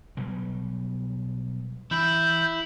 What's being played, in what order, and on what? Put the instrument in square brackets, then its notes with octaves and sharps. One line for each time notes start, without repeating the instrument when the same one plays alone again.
[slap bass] B2 F#3 G3
[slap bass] E3 [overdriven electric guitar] E4 [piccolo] G6